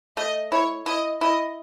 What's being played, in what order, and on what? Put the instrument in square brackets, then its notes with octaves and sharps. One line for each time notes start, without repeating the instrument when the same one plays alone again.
[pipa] A3 [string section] D#5
[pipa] E4 [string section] C#5
[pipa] E4 [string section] D#5
[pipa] E4 [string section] D#5